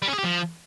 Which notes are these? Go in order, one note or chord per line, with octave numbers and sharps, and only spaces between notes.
G3
C#4
G#4
G4
F3